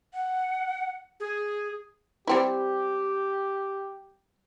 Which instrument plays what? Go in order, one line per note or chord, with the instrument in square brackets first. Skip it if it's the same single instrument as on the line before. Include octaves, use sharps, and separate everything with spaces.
[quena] F#5
[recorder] G#4
[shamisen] G3 C4 E4 [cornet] G4